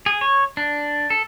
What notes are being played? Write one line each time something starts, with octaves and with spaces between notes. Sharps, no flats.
G#4
C#5
D4
A4